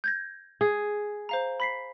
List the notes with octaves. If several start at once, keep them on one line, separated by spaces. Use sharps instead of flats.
G6 G#6 A#6
G#4
C5 F5 A#5
B5 B6 C7